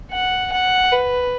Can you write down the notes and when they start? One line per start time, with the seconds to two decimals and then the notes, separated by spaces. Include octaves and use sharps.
0.12 F#5
0.52 F#5
0.92 B4